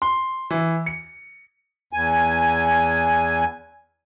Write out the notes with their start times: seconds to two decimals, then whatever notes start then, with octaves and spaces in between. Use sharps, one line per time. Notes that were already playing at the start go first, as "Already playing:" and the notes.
0.02 C6
0.50 E3
0.86 C#7
1.93 E2 G#5